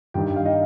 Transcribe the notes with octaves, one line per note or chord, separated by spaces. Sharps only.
G2 D#3 G4 G5
F5
D#4 D#5